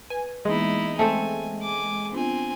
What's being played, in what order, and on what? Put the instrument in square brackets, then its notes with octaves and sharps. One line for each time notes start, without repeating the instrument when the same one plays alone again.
[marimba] B4 [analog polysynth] G#5
[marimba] E3 A#3 B3 [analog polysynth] G#3 [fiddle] D#4 E4
[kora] A3 C4 A4 [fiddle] G#5
[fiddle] G#5 D6
[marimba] B3 D4 F4 [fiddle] C4 G#5